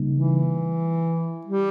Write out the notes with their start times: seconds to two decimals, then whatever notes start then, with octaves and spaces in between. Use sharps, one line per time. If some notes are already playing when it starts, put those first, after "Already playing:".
Already playing: C#3 G3 A#3 D#4
0.12 E3
1.47 G3